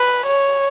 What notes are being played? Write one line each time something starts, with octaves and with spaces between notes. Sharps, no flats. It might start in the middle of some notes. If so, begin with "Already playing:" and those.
Already playing: B4
C#5